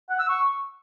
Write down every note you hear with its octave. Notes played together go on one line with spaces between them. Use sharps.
F#5
E6
C#6